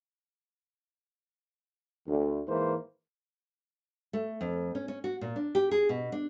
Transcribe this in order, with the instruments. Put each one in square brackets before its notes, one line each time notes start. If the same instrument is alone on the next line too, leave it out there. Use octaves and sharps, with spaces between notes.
[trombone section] D2
G#2 E3 A#3 C5
[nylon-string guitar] A3
F2
C#4
C#4
F#4
A#2
D4
G4
G#4
B2
D4